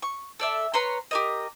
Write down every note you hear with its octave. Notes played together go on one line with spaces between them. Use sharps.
C#6
A4 D5 E5
B4 C#5 A#5 C6
G4 A#4 D#5